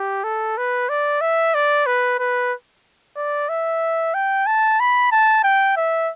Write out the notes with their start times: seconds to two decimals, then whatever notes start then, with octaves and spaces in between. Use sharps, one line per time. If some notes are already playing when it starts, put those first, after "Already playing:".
Already playing: G4
0.24 A4
0.57 B4
0.89 D5
1.21 E5
1.54 D5
1.86 B4
2.19 B4
3.17 D5
3.49 E5
4.14 G5
4.47 A5
4.80 B5
5.12 A5
5.44 G5
5.77 E5